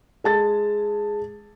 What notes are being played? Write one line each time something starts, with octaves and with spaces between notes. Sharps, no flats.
G#3 A5 A6